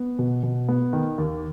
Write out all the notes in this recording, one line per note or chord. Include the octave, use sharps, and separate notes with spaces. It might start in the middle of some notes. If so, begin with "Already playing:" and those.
Already playing: B3
B2
B2
B3
D#3
D#2